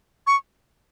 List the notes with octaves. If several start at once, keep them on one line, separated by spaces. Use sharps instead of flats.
C#6